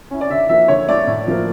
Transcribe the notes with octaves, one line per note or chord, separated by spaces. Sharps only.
C#4 E4
D5
D3 E5
F3 A#3 E5
D3 C#5
A3 E4 D5
A2
F3 A#3